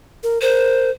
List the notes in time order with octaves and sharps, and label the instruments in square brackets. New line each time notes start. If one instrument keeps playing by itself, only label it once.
[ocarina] A#4
[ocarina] A#4 [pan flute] C5